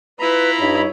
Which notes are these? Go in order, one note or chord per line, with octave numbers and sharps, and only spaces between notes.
E4 F4 B4 A#5 B5
G2 D#4 C#5